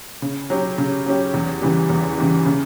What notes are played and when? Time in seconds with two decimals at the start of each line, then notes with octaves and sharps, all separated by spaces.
0.22 C#3
0.50 F#3 C#4 G4
0.78 C#3
1.06 F#3 C#4 G4
1.34 E2
1.62 C#3 E3 G3
1.90 E2
2.18 C#3 E3 G3
2.46 C#3